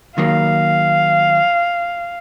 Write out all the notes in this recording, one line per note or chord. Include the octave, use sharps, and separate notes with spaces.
D#3 F#3 A#3 F5